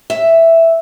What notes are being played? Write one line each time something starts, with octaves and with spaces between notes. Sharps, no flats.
E5